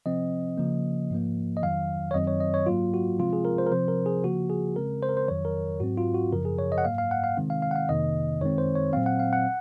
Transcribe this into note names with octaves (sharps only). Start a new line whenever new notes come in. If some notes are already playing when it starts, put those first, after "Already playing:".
C3 F3 C4 D#5
C#3 F3 A#3
G#2 F3 A#3
D#5
F2 D#3 F#3 F5
C#5
F#2 D#3 F#3 C4 D#5
C#5
D#5
C#5
G#2 F#3 A#3 F4
F#4
C3 F3 G#3 C4 F4
G#4
A#4
C5
A#4
C3 F3 C4 C5
A#4
G#4
C#3 F3 A#3 F#4
G#4
C#3 G#3 C4 A#4
C5
A#4
C5
F2 D#3 F#3 C#5
A#4
G#2 F#3 C4 F#4
F4
F#4
F#2 C#3 F3 A#4
G#4
C#5
D#5
F#5
G#2 F#3 A#3 F5
F5
F#5
F5
C3 D#3 G#3 C4
F5
F5
F#5
F5
F2 C3 D#3 A#3 D#5
F#2 D#3 G#3 C4 C#5
C5
C#5
A#2 F#3 C4 F5
F#5
F5
F#5